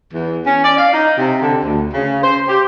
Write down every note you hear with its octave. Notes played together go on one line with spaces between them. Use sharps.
E2
C#4
D5
F5
D#4
C3
D3
D2
C#3
C5
G4